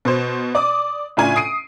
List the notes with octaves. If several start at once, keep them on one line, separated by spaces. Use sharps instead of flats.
B2 C5
D5 D6 D#6
A2 C#3 D4 E4 F4 G#5
D#6 C7 D7 D#7